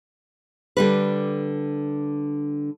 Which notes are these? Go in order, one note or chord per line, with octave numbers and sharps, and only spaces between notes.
D3 G3 B4